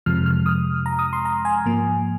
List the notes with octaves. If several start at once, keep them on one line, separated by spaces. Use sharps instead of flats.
F2 C3 F3 G#3 F6
F6
D#6
A#5
D#6
C6
A#5
G#5
G#2 F3 A#3